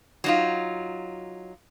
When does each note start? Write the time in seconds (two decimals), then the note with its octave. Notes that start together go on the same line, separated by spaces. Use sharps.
0.24 F#3 D#4 F4